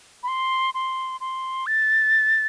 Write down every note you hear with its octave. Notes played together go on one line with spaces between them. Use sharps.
B5
C6
C6
C6
A6